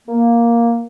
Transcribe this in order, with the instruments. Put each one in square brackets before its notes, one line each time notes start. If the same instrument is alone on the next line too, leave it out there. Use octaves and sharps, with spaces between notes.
[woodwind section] A#3